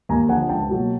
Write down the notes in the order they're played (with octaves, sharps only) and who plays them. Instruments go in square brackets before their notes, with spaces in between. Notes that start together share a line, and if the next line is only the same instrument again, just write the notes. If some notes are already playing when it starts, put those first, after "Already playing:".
[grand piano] D#2 G#5 A#5
D3 F3 F#5 G#5
C#2 G5 A5
B2 F#3 A#3